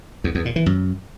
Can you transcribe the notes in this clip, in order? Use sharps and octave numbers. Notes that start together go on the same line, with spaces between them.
E2
E2
A#2
E3
F#2